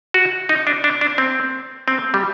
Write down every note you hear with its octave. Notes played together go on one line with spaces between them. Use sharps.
F#4
D#4
D4
D4
D4
C4
C4
G3